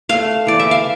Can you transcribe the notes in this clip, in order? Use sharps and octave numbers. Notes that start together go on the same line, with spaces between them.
A3 F5
E3 D5
E5
F5